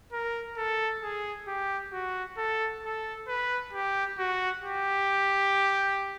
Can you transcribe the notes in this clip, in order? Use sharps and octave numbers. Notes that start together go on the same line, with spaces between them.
A#4
A4
G#4
G4
F#4
A4
A4
B4
G4
F#4
G4